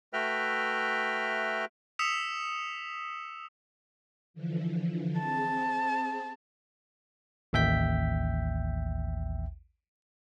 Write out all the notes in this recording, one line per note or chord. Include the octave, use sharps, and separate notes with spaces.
A3 F#4 B4 E5 G5 F6
D#6 E6 B6 C#7 E7 F7
D3 E3 F3
C4 G#4 A5
A1 D#2 E5 G5 G6 B6